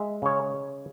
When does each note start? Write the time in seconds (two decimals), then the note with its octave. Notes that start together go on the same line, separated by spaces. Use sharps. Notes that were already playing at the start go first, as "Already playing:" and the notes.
Already playing: G#3 E5
0.22 C#3 C#5